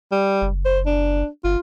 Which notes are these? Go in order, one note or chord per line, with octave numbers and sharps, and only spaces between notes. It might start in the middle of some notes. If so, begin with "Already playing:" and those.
G3
F#1
C5
D4
G1 F4